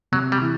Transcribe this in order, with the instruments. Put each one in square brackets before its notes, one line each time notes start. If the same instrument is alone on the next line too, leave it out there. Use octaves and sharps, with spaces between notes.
[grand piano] C3 [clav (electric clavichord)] F#3
[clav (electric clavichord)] G3
[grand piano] E3